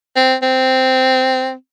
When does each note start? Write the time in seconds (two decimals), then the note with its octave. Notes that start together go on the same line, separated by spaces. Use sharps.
0.16 C4
0.42 C4